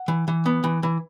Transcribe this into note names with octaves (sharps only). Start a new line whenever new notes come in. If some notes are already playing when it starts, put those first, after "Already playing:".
Already playing: F#5
E3
E3
B3
E3
E3